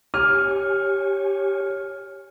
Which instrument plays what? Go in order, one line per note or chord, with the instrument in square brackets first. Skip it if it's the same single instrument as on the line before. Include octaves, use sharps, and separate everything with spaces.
[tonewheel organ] G4 C#5 G#5 [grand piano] F6